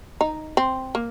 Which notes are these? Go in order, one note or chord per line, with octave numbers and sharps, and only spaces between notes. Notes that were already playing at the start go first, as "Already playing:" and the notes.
D#4
C4
A#3